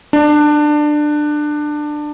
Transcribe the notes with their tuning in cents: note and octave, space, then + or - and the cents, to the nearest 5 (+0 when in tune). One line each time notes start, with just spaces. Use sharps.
D4 +20